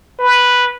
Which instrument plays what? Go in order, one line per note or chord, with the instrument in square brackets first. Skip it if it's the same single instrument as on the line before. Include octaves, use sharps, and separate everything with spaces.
[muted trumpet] B4